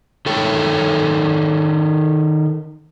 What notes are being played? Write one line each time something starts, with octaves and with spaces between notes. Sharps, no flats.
D#3 A4 C#5 G5